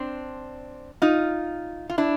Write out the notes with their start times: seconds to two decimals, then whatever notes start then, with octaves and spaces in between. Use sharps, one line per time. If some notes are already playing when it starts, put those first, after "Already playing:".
Already playing: C4 D4
1.02 D#4 F4
1.90 F4
1.98 D4 E4